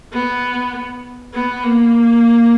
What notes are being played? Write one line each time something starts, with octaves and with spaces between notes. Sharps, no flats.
B3
B3
A#3